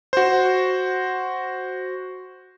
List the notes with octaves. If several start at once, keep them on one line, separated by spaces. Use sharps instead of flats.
F#4 C5